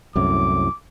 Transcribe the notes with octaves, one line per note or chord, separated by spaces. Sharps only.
C2 F#2 A2 D6